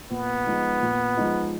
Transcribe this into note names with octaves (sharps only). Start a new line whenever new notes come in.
A#2 B3
F3 G#3 D#4
A#2
F3 G#3 D#4